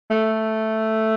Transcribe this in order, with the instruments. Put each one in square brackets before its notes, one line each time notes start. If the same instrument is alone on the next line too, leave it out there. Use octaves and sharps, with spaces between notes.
[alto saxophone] A3